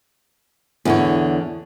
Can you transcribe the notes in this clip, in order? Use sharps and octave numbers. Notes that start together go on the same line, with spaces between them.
E2 D3 C#5